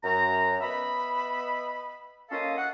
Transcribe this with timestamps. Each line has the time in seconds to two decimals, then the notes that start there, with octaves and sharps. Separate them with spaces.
0.03 F#2 A#5
0.60 B3 D#5 E5 B5
2.29 A#3 C#4 F4 A4 D#5 F5
2.56 F#5